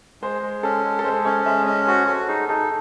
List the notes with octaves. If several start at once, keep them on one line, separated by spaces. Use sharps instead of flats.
G#3 C5
G#3
C#4 A4
G#3
A4
G#3 C5
C#4 C#5
G#3 E5
C#4 D#5
F#4 C5
F#4 A4
D#4 G#4
D#4 A4